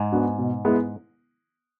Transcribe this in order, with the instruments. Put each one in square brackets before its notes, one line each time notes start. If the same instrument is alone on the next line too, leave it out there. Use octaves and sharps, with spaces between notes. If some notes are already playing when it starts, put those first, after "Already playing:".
Already playing: [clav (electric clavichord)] G#2
[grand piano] B3 D4 F#4
B2
G#3 B3 E4